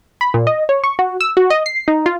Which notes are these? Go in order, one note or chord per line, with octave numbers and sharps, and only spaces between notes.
B5
A#2
D#5
C#5
C#6
F#4
E6
F#4
D#5
C7
D#4
F4